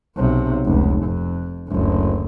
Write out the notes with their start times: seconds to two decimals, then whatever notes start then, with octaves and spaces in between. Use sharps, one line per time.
0.17 B1 C3
0.65 F1 C#2
1.03 F2
1.68 F#1 D2